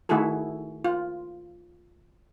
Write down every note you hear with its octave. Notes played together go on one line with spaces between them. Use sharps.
D#3 A3 E4 F#4 G#4 A4
F4